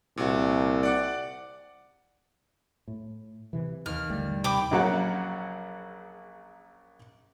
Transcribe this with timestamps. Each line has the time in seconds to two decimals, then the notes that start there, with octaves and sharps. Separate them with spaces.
0.17 C2 A#2 F#4
0.83 D5 F#5 D6
2.88 A2
3.53 C3 E3
3.86 D#2 F6
4.09 A1 D3 G3 A3
4.44 C3 G5 B5 D6
4.71 A#1 C#3 F#3 A#3 F#5